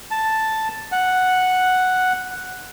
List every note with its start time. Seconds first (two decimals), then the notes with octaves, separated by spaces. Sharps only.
0.11 A5
0.92 F#5